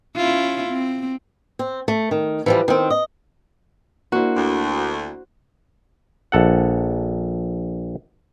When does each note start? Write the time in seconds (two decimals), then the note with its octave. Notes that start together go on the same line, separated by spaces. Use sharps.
0.16 C#4 E4 F4
0.69 C4
1.59 C4
1.88 A3
2.11 D#3
2.46 E3 F3 G3
2.68 D#3 C4
2.90 D#5
4.12 A#3 D4 E4 F#4 C5
4.35 D2
6.32 A#1 A4 F#5